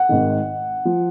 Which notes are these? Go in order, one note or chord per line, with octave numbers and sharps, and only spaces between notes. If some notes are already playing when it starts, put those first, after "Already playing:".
Already playing: F#5
G#1 G#2 D#3
F3